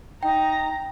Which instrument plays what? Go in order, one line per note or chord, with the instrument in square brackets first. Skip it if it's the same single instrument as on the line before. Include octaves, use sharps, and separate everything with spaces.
[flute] D#4 [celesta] G5 [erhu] A#5